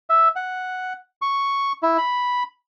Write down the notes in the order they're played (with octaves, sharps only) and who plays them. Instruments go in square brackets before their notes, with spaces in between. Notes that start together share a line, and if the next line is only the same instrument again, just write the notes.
[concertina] E5
F#5
C#6
E4
B5